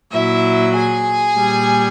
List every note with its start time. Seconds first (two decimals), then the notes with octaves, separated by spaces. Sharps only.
0.13 A#2 F#3 E4 E5
0.75 G#4 G#5
1.37 A#2 G3